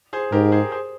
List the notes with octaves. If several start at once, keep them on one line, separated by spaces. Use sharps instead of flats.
G#4 C5
G#2 G4 A#4
G#4 C5
G#4 C5